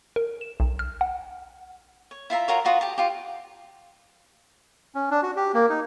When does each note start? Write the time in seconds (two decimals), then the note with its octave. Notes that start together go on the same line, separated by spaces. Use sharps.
0.16 A#4
0.41 E7
0.60 B1
0.79 F6
1.01 F#5
2.11 C#5
2.30 E4 F4 E5 A#5
2.48 F4 F#4 A#4 C#5
2.65 F4 F#4 B4 D#5
2.81 G4 A5
2.98 F4 G4
4.95 C#4
5.11 D4
5.23 F#4
5.36 G4
5.54 A#3
5.70 D#4